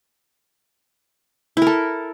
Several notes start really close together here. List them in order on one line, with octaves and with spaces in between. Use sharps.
E4 A#4 A4